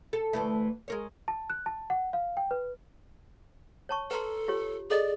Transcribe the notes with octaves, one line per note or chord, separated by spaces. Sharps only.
A4
D2 E3 A3
G#3 A#4 C#5
A5
F#6
A5
F#5
F5
G5
B4
C#5 A5 C#6
A4 B4 A#5 C6
F4 G4 C#5
G#4 A4 D5 D#5